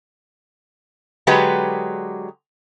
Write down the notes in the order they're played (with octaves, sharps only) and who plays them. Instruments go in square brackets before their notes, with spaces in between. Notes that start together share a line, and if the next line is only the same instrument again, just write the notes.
[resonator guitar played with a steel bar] D3 F#3 G#3 F#4 G4 B4